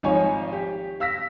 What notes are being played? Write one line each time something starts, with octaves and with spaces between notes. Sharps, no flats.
G#1 F3 D#4 F4 C#5 G#5
G4
F5 E6 A#6 B6